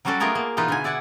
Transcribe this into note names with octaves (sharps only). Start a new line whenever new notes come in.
F#3 G3 C#4 F#4 A4 D5
A3 B3 F4 G#4 A#4 D5
A#3
B2 E3 D#4 F4 B4
D3 E3 G#5
E4 D5 E5 F#5